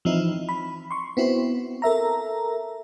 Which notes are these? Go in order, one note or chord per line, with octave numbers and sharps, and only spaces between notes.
E3 F3 C4 D#4 E4
B5
C6 C#6
B3 C4 E4 F#4
A4 A#4 E5 A#5